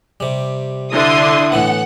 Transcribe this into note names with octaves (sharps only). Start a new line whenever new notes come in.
C3 G3
D3 D4 E4 C6 D#6
A2 E3 B3 F#5